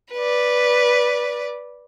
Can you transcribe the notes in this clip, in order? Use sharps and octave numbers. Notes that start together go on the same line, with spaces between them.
B4 D5